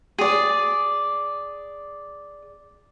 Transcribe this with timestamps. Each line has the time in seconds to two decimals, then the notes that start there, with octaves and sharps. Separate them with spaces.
0.19 G#4 D5